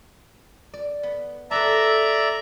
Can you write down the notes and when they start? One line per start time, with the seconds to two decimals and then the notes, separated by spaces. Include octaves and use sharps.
0.74 D5
1.03 B3
1.51 A4 B4 D5 E5 A5 A#5